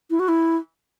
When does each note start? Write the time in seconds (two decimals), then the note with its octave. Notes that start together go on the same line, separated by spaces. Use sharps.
0.10 E4
0.19 F#4
0.28 E4